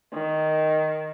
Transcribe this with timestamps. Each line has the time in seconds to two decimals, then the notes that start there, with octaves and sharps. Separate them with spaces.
0.13 D#3